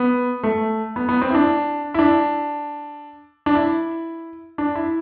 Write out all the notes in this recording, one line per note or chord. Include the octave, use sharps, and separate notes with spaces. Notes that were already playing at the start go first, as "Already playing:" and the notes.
Already playing: B3
A3
B3
B3
C4
E4
D4
E4
D4
D4
E4
D4
E4